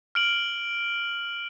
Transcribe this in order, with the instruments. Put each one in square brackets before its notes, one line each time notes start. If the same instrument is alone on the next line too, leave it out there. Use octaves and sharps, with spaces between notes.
[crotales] F6 D7 F#7